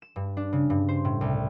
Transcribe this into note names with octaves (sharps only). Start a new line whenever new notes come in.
E7
G2
D4
C#3
G2
C5
A2
C2